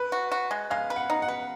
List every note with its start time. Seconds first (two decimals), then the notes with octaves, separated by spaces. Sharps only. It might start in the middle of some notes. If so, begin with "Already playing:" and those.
Already playing: B4
0.12 F#4
0.32 F#4
0.51 G#3
0.70 G#3 F5
0.90 B4
0.96 F#5
1.10 D#4
1.22 F#5
1.28 B4